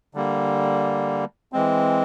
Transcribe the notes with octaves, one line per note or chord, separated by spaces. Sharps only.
D3 G3 A#3
E3 G#3 C4